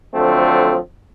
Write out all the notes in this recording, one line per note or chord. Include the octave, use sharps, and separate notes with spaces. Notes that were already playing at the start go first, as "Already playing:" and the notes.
D3 F3 F#3 A3 C4